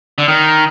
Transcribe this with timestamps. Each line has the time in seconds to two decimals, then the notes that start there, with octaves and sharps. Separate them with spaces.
0.18 D3
0.28 D#3